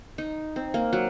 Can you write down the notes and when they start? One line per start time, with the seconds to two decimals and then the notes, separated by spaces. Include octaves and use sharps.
0.18 D#4
0.56 C4
0.74 A#3
0.93 F#3